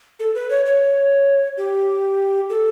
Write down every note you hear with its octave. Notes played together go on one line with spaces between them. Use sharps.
A4
B4
C#5
C#5
G4
A4